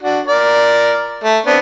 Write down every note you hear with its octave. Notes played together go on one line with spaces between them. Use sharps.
D4 F#4
A#4 D5
A3
B3 C4 D4